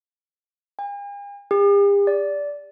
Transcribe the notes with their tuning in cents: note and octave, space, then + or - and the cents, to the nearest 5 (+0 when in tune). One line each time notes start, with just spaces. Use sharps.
G#5 -45
G4 +45
D5 -15